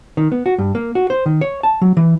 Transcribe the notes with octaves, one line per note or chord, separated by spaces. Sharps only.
D#3
B3
F#4
G2
A#3
F#4
C5
D#3
C#5
A5
F#3
E3